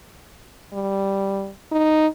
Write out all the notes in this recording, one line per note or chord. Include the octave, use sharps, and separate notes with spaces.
G3
D#4